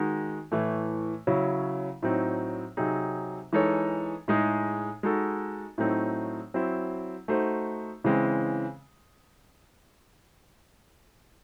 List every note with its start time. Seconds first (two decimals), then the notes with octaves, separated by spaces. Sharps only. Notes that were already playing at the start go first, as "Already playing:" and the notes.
Already playing: D#3 G#3 D#4 F#4
0.52 A2 E3 A3
1.27 C#3 F#3 C#4 E4
2.02 A2 F#3 C4 D#4
2.77 C3 F#3 C4 D#4 G#4
3.53 E3 G#3 D#4 A4 C#5
4.28 A2 G#3 D#4 G#4
5.03 G#3 D#4 F#4 A4
5.78 A2 F#3 A3 C4 D#4
6.54 F#3 C4 E4 C5
7.28 A3 D#4 F#4 C5
8.04 C#3 E3 G#3 C4